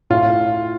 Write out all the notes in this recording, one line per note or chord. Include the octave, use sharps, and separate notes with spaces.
A2 F4